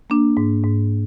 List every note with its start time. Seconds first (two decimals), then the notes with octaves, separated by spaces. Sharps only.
0.10 A#3 D4
0.37 G#2
0.64 G#2